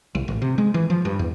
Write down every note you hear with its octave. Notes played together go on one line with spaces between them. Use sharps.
C2
A1
C3
G#3
E3
F3
G2
E2